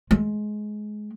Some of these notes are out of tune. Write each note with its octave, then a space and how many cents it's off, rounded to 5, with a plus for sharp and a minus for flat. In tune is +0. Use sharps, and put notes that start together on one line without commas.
G#3 +20